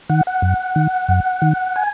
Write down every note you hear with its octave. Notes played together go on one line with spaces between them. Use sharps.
D#3 F#5
F#5
F#2
D#3
F#2
D#3
G#5